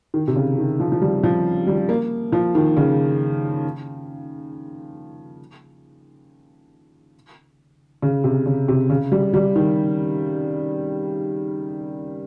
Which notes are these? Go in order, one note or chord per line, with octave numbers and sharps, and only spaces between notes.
D#3
C3
C#3
D#3
F3
F3
G3
F3
G3
A#3
F3
D#3
C#3
C#3
C3
C#3
C3
C#3
G3
G3
D#3